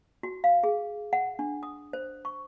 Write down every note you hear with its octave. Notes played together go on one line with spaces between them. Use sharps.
F#4
F5
G#4
F#5
D4
D#6
C5
C#6